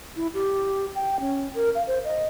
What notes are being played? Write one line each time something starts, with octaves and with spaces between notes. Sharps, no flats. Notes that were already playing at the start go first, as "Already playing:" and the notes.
E4
G4
G5
C#4
A#4
F5
C5
D#5